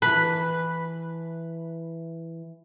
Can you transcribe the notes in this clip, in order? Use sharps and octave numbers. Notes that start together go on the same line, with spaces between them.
E3 B4 A5